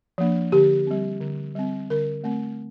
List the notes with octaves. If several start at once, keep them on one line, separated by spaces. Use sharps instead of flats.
F3 A#3 D4
D3 G4
G3 C4
D3
G3 C4
D3 A#4
A3 C4